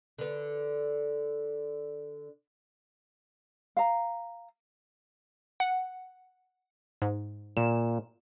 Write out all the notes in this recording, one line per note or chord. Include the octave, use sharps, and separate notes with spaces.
D3 B4
F5 A#5
F#5
G#2
A#2 E7